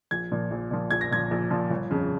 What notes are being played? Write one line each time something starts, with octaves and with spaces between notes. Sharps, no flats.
A#1 G#6
A#2 F3
A#1
A#2 F3
A#1 G#6
A#6
A#2 F3 G#6
A#1
A#2 F3
G1
F2 C#3